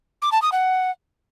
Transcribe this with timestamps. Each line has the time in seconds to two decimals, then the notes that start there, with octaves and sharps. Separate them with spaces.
0.22 D6
0.32 A5
0.42 D#6
0.52 F#5